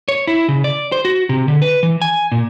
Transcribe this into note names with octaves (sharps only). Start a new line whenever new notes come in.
C#5
E4
C#3
D5
C5
F#4
C3
D3
B4
E3
G#5
A#2